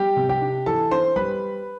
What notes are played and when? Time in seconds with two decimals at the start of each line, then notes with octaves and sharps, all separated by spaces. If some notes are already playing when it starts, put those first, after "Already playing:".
Already playing: G3 G4 G5
0.17 C3
0.29 G4 G5
0.42 D4
0.66 E3 A4 A5
0.91 D4 C5 C6
1.16 G3 B4 B5